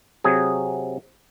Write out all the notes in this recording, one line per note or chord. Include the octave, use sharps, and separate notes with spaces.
C3 F#3 G#4